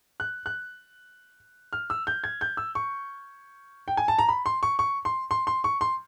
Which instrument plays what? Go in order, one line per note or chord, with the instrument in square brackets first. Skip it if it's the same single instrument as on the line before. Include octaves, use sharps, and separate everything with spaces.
[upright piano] F#6
F#6
F6
E6
G6
G#6
G6
E6
C#6
G5
G#5
A5
A#5
B5
C6
C#6
C#6
C6
C6
C6
C#6
C6